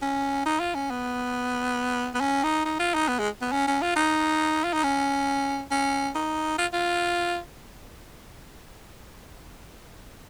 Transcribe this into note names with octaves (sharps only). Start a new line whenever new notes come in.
C#4
D#4
F4
C#4
B3
B3
C#4
D#4
D#4
F4
D#4
B3
G#3
B3
C#4
C#4
F4
D#4
F4
D#4
C#4
C#4
D#4
F4
F4